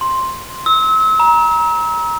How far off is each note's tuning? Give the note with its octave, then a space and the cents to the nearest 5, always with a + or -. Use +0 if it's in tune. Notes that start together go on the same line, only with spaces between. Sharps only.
C6 +5
E6 -35
A#5 +25